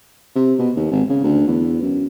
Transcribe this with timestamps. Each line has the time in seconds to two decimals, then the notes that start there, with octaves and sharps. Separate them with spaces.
0.36 C3
0.59 B2
0.76 D#2
0.91 G#1
1.09 C#3
1.24 D2
1.48 E2
1.82 F#2